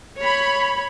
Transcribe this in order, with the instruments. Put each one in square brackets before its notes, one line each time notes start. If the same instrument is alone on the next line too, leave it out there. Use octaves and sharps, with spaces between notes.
[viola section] C#5 B5